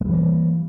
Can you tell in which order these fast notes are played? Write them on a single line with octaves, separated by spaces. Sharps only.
G#3 G3 E3 A#3